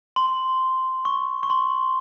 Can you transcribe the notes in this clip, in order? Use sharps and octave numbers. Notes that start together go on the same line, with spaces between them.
C6
C#6
C#6
C6